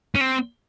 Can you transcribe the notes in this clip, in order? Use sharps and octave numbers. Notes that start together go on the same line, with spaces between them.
C#4
C4